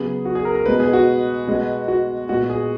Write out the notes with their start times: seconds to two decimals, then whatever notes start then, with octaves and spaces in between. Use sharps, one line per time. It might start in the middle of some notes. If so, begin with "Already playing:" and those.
Already playing: C#3 F#3 B3 G#4
0.25 F#4
0.35 G#4
0.45 A#4
0.55 A#4
0.66 B2 G#3 B3 B4
0.80 G#4
0.93 F#4
1.47 B2 G#3 B3
1.88 F#4
2.29 A#2 G#3 B3 F#4
2.49 G#4